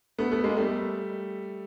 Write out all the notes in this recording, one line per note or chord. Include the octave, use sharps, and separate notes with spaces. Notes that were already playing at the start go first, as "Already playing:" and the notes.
A3 B3
A3 B3
G#3 A#3
G3 A3